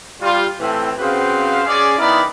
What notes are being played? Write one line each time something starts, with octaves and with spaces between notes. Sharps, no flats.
G3 F4
A2 E3 C4
C#3 C4 F#4 B4 C5 F5
C#4 G#4 D5
D#3 B3 E4 A#4 D5 B5